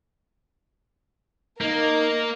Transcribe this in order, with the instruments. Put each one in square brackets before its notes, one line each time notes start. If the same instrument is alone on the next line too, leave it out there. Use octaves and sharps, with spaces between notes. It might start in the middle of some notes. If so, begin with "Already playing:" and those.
[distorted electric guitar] A#3 [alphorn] D#4 [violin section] A#4